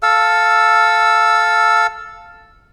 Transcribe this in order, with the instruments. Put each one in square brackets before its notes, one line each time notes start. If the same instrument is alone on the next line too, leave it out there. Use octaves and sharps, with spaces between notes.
[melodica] A4 F5 E6